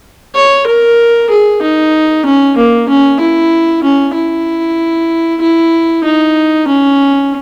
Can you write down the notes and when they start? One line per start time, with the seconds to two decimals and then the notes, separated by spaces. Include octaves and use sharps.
0.35 C#5
0.67 A#4
1.30 G#4
1.62 D#4
2.26 C#4
2.57 A#3
2.89 C#4
3.20 E4
3.84 C#4
4.14 E4
5.41 E4
6.04 D#4
6.68 C#4